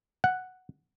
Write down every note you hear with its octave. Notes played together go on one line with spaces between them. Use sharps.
F#5